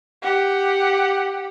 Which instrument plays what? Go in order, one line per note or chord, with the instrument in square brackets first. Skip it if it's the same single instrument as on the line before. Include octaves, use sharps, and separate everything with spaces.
[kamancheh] G4 F#5